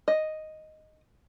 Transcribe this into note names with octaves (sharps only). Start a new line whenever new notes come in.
D#5